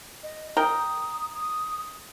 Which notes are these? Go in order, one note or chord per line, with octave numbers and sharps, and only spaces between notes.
D#5
A#4 G5 D#6
D#6